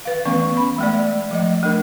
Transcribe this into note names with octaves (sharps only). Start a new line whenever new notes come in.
B4 F5
E3 A3 B3 C#4 C#6
B5
G#3 A3 D5
F3 A3 D#5
A3 D4 A#4